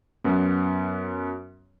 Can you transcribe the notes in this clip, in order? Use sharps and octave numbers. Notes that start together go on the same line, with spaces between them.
F#2 B3